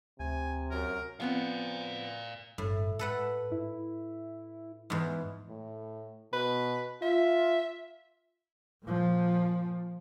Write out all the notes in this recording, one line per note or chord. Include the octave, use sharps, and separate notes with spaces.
D2 C3 G#5
F#2 A#4
F3 B3 C4 D5 F5
G1 A2
G#2 A4 B4 F#5
E4
E2 G#2
A2
B2 B4
F4 E5
A#2 F3